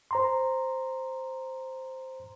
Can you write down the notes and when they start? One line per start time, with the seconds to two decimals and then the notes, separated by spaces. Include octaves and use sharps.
0.11 C5 A#5 C6